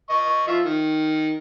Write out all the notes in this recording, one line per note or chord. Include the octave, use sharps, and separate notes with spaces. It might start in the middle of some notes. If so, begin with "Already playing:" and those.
D#5 C#6
F3 F4 E5
D#3